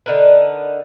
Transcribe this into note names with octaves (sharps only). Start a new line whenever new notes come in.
D3 D#4 A#4 B4